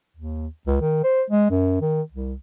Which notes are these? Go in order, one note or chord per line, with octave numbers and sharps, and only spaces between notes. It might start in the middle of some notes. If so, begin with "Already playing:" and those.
D#2
C#2
D#3
C5
G#3
F#2
D#3
C2